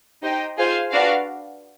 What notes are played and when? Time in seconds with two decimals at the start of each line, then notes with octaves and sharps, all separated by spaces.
0.22 D#4 G4 C5 D#5 G5
0.57 F4 G#4 C5 F5 G#5
0.91 D4 F#4 B4 D5 F5